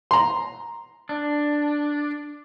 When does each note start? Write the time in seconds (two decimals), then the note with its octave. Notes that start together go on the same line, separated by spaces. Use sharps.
0.11 A#5 C6
1.09 D4